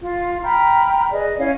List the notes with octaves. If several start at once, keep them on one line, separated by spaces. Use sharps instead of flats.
F4
G5 A#5 B5 F6
G#4 B4 D5 D#5
C#4 E4 C#5 F5